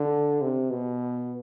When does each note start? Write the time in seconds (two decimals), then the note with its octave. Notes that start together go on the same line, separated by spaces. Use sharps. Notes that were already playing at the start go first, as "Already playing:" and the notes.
Already playing: D3
0.41 C3
0.70 B2